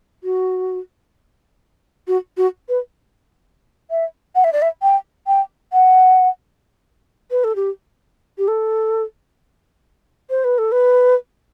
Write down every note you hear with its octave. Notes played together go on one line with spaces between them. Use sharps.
F#4
F#4
F#4
B4
E5
F#5
E5
D5
E5
G5
G5
F#5
B4
A4
G4
G4
A4
C5
B4
A4
B4